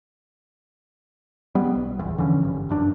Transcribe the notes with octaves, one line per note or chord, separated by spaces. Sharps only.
G3 B3
B1
D1 G1 E2
D3 E3 F3 C#4
G#1 G2
E1 F#2 D4